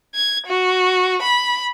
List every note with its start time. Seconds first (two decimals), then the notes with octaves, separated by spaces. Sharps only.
0.15 G#6
0.47 F#4
1.22 B5